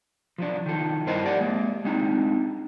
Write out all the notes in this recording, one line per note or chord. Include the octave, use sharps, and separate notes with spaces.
F3 F#3 D4
D#3 F3 A4
G2 E4 A#4 C5 D#5 A5
G4 A#4 D5 F5 F#5
G#3 A#3
G#3 C4 D4 D#4